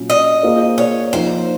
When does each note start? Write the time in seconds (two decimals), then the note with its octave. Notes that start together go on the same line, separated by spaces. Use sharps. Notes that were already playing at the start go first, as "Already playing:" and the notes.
Already playing: A#2 F#3 C#4 F4
0.10 D#5
0.43 A#3 F4 G#4 C5
0.78 C#5
1.13 F3 A#3 D#4 C5